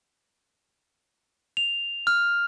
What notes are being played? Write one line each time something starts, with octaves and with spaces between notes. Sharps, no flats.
F7
F6